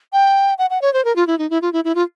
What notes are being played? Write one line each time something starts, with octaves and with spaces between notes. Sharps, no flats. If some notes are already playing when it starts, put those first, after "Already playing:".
G5
F#5
F#5
C#5
C5
A#4
F4
E4
D#4
E4
F4
E4
E4
F4